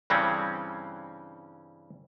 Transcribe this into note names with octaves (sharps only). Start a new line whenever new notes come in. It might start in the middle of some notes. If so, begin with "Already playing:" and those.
G2 C#3 E3 G3 C4 C#4